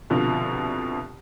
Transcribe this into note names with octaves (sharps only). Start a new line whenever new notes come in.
C2 B2 D3 F3